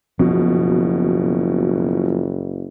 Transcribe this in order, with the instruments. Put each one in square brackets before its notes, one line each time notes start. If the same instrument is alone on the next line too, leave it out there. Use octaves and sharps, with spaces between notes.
[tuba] F#1 [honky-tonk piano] B2 [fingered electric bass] F3